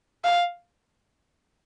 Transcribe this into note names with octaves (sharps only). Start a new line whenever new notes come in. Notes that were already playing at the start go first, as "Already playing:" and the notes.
F5